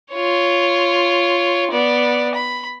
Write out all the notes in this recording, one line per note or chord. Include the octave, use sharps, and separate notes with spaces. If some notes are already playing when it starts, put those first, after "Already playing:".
F4 C#5
B3 D5
B5